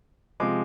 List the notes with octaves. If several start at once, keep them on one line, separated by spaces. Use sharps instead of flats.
C3 F3 G#3 D6